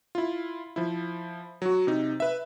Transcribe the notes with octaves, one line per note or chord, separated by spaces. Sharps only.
E4 F4
F3 E4
F#3 F#4
C3 D#4
B4 E5